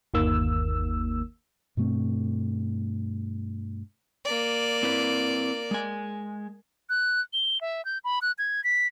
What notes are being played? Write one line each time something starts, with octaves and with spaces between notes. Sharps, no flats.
G1 D#2 D#3 A#3 E6
G2 B2 A3 C4
A#3 D5
C4 E4 B4
G#3 G#5
F#6
G7
E5
G6
B5
F#6
G#6
B6